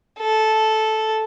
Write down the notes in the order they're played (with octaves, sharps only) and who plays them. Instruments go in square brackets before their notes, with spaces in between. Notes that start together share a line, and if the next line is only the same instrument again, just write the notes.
[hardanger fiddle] A4